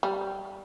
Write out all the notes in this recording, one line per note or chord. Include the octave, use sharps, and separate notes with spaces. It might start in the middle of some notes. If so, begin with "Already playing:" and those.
G3